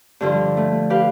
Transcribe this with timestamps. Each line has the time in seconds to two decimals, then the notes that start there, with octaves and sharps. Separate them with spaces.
0.20 G2 D3 F3
0.57 A3
0.90 G4 B4 F5